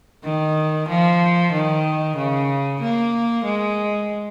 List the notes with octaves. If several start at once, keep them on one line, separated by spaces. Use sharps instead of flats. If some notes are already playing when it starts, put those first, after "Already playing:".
D#3
F3
D#3
C#3
A#3
G#3